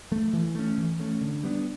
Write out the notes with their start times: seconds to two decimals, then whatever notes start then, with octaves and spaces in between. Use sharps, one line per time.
0.11 F3 A3
0.33 E3
0.55 A3 C#4
0.77 E3
0.99 A3 C#4
1.21 D3
1.43 G3 B3 D4